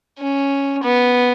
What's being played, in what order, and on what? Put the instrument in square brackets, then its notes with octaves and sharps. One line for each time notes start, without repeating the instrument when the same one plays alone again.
[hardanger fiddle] C#4
B3